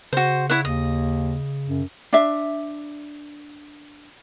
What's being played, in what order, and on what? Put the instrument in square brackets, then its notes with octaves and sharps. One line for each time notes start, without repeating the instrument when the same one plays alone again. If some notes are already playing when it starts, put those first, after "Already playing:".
[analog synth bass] C#3 [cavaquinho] F#4 C5
[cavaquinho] E4 C#5 F#5
[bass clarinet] D#2 [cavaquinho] D#5
[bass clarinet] F#2
[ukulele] D4 E5